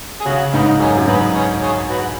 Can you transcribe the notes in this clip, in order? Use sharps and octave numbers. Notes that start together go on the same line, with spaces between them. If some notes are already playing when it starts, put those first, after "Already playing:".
G#4
C#3 C#4 F#4
G#2 B3 D#4
F#2 G#4 C#5
F#2
G#2 B4 D#5
G#4 C#5
G#4 C#5
F#4 B4